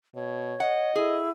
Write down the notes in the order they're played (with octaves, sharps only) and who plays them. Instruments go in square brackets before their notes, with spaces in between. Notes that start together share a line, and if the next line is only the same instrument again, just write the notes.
[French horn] B2 [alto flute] C#5
[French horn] D#5 [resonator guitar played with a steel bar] F#5
[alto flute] E4 [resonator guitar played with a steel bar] G#4